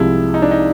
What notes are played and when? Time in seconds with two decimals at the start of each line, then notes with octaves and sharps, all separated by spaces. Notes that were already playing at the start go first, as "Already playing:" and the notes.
Already playing: C2 C3 F3 G#3 E4
0.34 D#4
0.42 D4
0.51 D#4